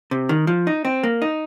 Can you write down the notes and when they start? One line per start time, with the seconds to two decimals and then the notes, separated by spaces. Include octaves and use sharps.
0.11 C3
0.29 D#3
0.47 F3
0.67 D#4
0.85 C4
1.03 A#3
1.22 D#4